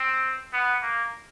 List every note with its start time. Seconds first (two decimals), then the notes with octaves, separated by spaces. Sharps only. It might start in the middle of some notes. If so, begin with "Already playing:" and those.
Already playing: C4
0.53 B3
0.82 A#3